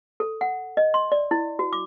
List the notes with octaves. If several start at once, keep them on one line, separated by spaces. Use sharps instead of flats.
A4
F#5
D#5
C6
D5
E4
F#4
D6